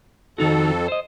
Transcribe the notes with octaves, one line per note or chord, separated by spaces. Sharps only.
F2 D#3 D#4 F#4 A4
C5 D#5